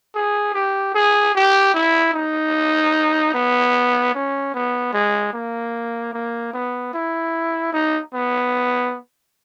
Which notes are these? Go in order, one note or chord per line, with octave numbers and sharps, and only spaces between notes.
G#4
G4
G#4
G4
E4
D#4
B3
C#4
B3
G#3
A#3
A#3
B3
E4
D#4
B3